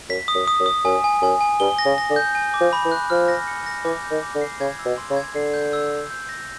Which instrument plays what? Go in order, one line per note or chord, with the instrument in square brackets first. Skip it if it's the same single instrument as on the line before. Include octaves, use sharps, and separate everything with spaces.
[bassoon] F#2 [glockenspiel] B6
[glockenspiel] D#6
[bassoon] F#2
[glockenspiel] D#6
[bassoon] F#2
[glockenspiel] D#6
[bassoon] F#2 [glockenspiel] G#5
[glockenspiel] G#5
[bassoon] F#2 [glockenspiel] G#5
[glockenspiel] G#5
[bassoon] G2 [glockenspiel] G7
[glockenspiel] A#6
[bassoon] C#3
[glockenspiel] A#6
[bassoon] D3
[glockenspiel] G6
G#5
D6
[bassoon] F3
[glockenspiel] B5
[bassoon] E3
[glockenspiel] F#6
[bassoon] F3 [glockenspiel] F6
[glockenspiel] A#6
C#7
A#6
[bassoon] E3 [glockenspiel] D6
[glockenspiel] G6
[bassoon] D#3
[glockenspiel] D6
[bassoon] D3
[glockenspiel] C7
[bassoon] C#3 [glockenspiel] G#6
[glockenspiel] E6
[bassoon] B2
[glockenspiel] C6
[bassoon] C#3
[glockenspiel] G#6
[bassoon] D3 [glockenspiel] C7
[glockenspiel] G6
E6
E6
G6
A#6